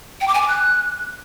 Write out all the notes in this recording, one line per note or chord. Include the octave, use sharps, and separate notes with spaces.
G5
D6
G#5
D6
F#6